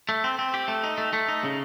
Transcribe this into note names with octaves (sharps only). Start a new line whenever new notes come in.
A3
C4
C4
G4
A3
D#4
A3
A3
D#4
C#3